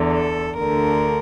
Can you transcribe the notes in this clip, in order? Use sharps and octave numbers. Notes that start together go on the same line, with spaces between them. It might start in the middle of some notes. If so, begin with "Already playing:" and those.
Already playing: E2 D3
A4
D2 D3 A#4